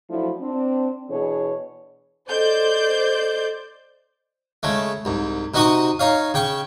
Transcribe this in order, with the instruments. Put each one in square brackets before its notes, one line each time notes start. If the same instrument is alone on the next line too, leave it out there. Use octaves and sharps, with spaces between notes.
[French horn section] F3 F#3 A3 D4 E4
C4 D4
B2 E3 D4 G#4 C#5
[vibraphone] A4 D#5 [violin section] C5 D5 G6
[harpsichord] C#3 G#3 A3
C2 G#2
C3 D#4 F#4 D#5 C#6 D#6
D#4 C#5 F5
C#3 G5 C#6